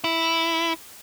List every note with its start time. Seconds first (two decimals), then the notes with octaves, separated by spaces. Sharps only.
0.04 E4